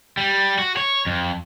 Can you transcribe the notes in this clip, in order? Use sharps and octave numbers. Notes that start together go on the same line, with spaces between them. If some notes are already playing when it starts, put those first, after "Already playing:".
G3
F#4
C#5
F2